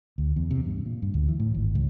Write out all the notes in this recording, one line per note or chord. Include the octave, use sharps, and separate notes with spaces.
D2
E2
C3
G2
A#2
G2
D2
E3
A2
G#1
C#2